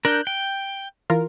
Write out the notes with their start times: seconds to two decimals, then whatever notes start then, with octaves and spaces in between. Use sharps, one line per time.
0.05 D4 A#4 F#6 G6
0.27 G5
1.10 E3 F4 A#4